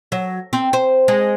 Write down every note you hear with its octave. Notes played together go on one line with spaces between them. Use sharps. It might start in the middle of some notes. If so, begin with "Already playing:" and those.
F#3
C4
C5
G#3